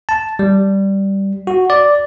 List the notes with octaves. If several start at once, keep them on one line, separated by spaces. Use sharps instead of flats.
A5
G3
F#4
D5